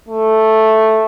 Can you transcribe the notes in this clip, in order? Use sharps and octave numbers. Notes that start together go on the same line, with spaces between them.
A3